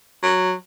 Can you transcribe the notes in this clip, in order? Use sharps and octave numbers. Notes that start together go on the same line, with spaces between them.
F#3